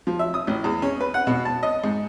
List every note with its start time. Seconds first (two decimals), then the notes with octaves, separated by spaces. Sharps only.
0.07 F3
0.19 E5
0.34 D#6
0.47 A1
0.64 E2
0.82 C#4
1.01 B4
1.14 F#5
1.27 B2
1.45 A5
1.63 D#5
1.84 G#2